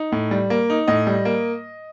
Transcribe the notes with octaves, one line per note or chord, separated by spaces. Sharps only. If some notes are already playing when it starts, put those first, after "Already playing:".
Already playing: D#4
A2
G3
A#3
D#4
A2 D#5
G3
A#3